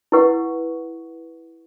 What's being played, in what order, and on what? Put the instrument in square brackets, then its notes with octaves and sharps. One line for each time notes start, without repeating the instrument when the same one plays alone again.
[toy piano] E4 B4 F#5 C#6